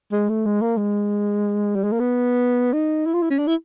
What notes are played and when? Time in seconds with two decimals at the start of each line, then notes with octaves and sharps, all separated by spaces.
0.12 G#3
0.29 A3
0.45 G#3
0.61 A#3
0.77 G#3
1.75 G3
1.84 G#3
1.92 A#3
2.00 B3
2.73 D#4
3.06 E4
3.14 F4
3.22 E4
3.30 C#4
3.38 D4
3.47 E4